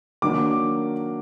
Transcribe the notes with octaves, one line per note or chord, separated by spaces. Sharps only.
D#3 F#3 A#3 D4 D6